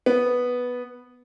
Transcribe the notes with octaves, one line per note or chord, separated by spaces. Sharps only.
B3